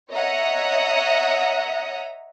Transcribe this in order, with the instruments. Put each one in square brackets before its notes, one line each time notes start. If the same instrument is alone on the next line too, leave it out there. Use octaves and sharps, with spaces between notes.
[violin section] C#5 D#5 E5 F#5 A#5 D#6